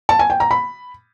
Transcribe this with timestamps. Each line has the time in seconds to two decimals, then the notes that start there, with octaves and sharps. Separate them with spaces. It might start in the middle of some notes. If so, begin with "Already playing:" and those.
0.09 A5
0.19 G#5
0.30 G5
0.40 A#5
0.51 B5